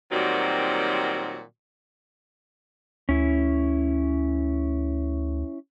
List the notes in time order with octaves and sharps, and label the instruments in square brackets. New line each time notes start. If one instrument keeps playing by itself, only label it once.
[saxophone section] A#2 D#3 F#3 G3 C4 F#4
[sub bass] D2 [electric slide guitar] C#4 E4